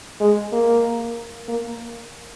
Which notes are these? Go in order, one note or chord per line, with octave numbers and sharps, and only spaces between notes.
G#3
A#3
A#3